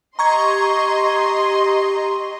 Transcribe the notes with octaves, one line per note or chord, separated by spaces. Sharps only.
G4 D#5 A#5 C6 C#6 G#6